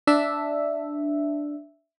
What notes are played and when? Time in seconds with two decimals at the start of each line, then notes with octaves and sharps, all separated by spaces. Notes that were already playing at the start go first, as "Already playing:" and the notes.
0.07 D4 E5